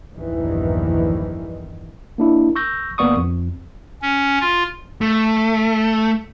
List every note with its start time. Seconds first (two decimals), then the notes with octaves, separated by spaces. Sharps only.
0.14 A#1 E2 G2 D#3 E3
2.18 A#3 D4 E4
2.56 C#6 E6 G6 A#6
2.98 G#1 A#3 B3 D5 C#6 D#6
3.17 F2
4.02 C#4
4.41 F4
5.01 A3